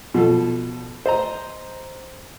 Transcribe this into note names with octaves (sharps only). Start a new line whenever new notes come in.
B2 F3 A4
C5 D#5 A#5